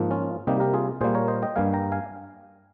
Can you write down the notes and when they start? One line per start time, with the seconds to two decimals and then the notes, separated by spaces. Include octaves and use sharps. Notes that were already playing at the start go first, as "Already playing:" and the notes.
Already playing: G#2 F3 A#3
0.11 C#4 F4
0.47 C3 G3 A#3 D#4 G4
0.60 G4 A#4
0.74 F4 G#4
1.01 A#2 G3 A#3 G#4 C5
1.15 A#4 C#5
1.28 C5 D#5
1.42 D#5 G5
1.56 G2 G3 A#3 F5 G#5
1.73 G5 A#5
1.92 F5 G#5